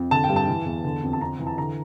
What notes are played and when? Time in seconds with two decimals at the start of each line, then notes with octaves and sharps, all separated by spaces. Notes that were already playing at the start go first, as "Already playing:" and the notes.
Already playing: F2
0.11 D3 A5
0.24 G5
0.29 G2
0.36 A5
0.47 E3
0.66 E2
0.84 D3
1.03 F2
1.13 A5
1.21 F2 A#5
1.39 E3
1.47 A5
1.58 D3 A#5